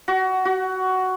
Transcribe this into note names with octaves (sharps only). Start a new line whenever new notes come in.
F#4
F#4